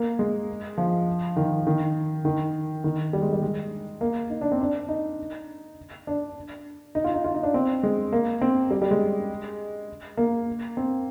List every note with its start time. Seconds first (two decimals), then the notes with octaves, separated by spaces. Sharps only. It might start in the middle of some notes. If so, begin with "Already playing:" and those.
Already playing: A#3
0.19 G#3
0.78 F3
1.36 D#3
1.67 D#3
2.25 D#3
2.84 D#3
3.13 G3
3.22 G#3
3.33 G3
3.42 G#3
4.01 A#3
4.30 D#4
4.41 D4
4.52 C4
4.61 D4
4.89 D#4
6.07 D4
6.95 D#4
7.04 F4
7.14 D#4
7.24 F4
7.34 D#4
7.43 D4
7.54 C4
7.83 G#3
8.13 A#3
8.41 C4
8.71 G3
8.82 G3
8.91 G#3
10.17 A#3
10.77 C4